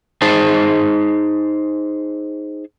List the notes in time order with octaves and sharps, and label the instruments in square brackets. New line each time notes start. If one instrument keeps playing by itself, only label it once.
[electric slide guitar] D#4 G#4 C5 A5